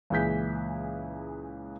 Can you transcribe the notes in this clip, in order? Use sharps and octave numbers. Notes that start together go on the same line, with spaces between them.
C#2 A#2 E3 G#4 G6 B6